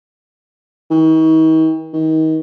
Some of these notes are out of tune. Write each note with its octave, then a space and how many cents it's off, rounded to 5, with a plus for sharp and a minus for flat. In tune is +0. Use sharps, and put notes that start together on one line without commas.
D#3 +45
D#3 +30